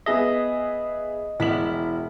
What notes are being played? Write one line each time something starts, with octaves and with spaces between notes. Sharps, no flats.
B3 G#4 D#5 E5
E1 E4 B6 F#7